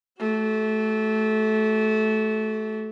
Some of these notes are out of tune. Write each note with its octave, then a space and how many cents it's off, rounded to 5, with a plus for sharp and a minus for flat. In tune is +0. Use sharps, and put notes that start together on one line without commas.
A3 -20 F#4 +30